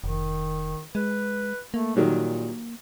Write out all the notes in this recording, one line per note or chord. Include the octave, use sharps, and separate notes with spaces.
F1 D#3
G#3 B4
A3 A#3
A#2 D#3 F#3 G3